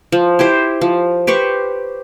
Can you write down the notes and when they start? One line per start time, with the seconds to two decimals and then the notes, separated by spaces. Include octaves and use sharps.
0.12 F3
0.39 E4 G4 C5
0.81 F3
1.27 G4 B4 C5 C#6